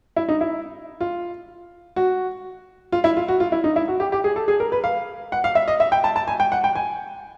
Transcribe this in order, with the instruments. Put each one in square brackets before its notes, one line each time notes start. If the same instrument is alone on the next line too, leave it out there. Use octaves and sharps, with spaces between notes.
[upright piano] E4
D#4
E4
F4
F#4
F4
E4
F4
F#4
F4
E4
D#4
E4
F#4
G4
G4
G#4
A4
G#4
A#4
B4
F5
F#5
F5
E5
D#5
E5
G5
A5
A5
G#5
G5
F#5
G5
G#5